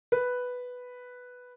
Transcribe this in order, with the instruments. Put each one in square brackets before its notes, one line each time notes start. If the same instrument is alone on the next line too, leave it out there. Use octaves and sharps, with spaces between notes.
[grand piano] B4